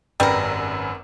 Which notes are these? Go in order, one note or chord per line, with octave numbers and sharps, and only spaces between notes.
G#1 F#2 G3 A#4 B4